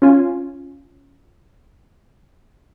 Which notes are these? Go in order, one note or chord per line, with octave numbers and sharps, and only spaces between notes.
C#4 F4 G#5